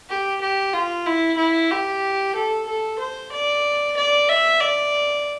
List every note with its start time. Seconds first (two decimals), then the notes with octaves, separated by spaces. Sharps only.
0.09 G4
0.41 G4
0.73 F4
1.06 E4
1.38 E4
1.71 G4
2.36 A4
2.67 A4
2.99 C5
3.32 D5
3.97 D5
4.29 E5
4.61 D5